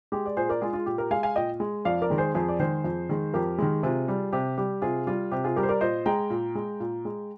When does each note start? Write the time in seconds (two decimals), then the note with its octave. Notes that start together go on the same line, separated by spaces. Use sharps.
0.12 G#3 G4
0.26 D5
0.37 A#2 G#4 C5
0.49 A#4 D5
0.61 G#3 F4 G#4
0.73 F4
0.86 A#2 G4
0.98 G4 A#4
1.11 G#3 F5 G#5
1.23 F5 G#5
1.36 A#2 D#5 G5
1.60 G#3
1.85 F2 D5 F5
2.02 A#4 D5
2.10 D#3 G#3
2.18 G#4 C5
2.35 F2 G#4 C5
2.48 D5
2.59 D#3 G#3 G#4 C5
2.84 F2
3.09 D#3 G#3
3.34 F2 G4 A#4
3.58 D#3 G#3
3.83 C3 F4 G#4
4.08 G3
4.33 C3 G4
4.58 G3 G4
4.82 C3 F4 G#4
5.07 G3 F4
5.31 C3 G4
5.44 F4 G#4
5.56 G3 G4 A#4
5.63 C5
5.69 A#4 D5
5.81 A#2 C5 D#5
6.06 G#3 G5 A#5
6.30 A#2
6.55 G#3
6.80 A#2
7.05 G#3